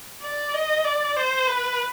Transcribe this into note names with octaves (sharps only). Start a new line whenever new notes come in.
D5
D#5
D5
C5
B4